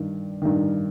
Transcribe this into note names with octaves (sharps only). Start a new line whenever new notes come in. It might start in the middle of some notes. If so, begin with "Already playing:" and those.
Already playing: G2 D#3
G2 D#3